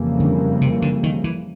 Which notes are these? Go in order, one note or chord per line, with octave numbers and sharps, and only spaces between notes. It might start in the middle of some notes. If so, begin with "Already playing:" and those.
Already playing: F2 C#3 E3 G3 A#3
D3
C3
D3
D#3
E3